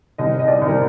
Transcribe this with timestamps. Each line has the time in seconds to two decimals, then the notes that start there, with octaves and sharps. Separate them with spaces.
0.18 C2 D#5
0.39 D#5
0.48 D5
0.62 C2
0.68 A#4